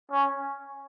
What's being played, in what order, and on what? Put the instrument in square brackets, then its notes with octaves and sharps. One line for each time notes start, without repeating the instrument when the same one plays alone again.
[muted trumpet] C#4